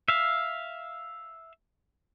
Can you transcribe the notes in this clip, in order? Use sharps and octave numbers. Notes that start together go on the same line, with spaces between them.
E5 F5